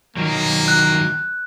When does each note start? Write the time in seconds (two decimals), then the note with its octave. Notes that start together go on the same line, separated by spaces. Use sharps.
0.17 D#3 F#3 A#3
0.68 F#6